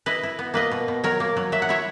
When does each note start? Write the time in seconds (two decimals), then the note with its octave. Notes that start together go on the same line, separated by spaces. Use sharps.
0.06 E4 B4 D#5
0.23 E4
0.39 B3
0.54 A#3 B4 D#5
0.71 B2
0.88 B2
1.04 F#3 A#4 C#5
1.20 A#3
1.37 F#3
1.52 F#3 E5
1.62 F#5
1.69 E4 C#5 E5